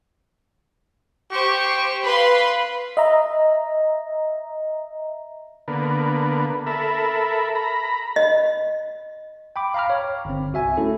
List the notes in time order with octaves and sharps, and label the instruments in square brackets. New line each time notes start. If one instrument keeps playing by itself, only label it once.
[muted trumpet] G4 [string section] C5 C#6
[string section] B4 F5 C6 [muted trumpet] B5
[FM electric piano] D#5 E5 A#5
[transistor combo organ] D3 A#3 B3
A4 A#4 E5 B5
A#5 B5
[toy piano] D#5
[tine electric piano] G5 B5 D6
F5 G5 A#5 B5 D6 F6
C#5
G1 C4
C2 F#4 E5 G#5
A3 C#4 E4 A4